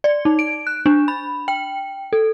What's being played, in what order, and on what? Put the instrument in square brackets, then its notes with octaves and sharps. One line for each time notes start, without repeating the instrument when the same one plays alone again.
[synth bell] D5
D#4
D7
F#6
D4
B5
G5
A4